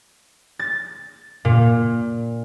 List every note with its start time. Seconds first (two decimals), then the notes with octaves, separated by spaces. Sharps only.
0.59 A6
1.45 A#2